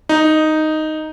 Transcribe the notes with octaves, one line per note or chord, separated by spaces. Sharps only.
D#4